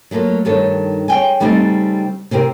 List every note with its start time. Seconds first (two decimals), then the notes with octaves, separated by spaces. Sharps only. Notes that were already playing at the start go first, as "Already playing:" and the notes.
0.11 F#3 A3 A#3 F4
0.45 G2 D#3 A4 C#5
1.08 G#4 C#5 G5 G#5
1.40 C#3 G3 A3 C4 D#4
2.31 C3 C4 G4 A#4